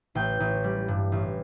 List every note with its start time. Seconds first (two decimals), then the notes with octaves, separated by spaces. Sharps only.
0.15 A1 G5
0.40 A1
0.64 G3
0.88 G2
1.12 A1